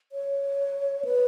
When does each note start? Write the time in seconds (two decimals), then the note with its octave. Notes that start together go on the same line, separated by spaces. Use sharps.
0.12 C#5
1.05 B4